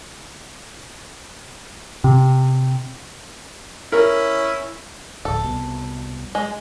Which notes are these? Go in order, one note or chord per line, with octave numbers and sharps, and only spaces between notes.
C3
C#4 E4 A#4
D1 A#1 A4
C2 B2
G#3